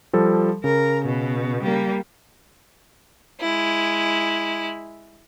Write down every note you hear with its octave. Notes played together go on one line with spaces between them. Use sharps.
F3 G3 A4
C#3 A#4
B2
G3 A#3
G#3 E4